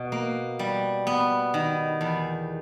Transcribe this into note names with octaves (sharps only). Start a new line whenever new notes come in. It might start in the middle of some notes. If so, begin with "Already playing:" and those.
Already playing: B2
A#3
G3
B3
D#3
E2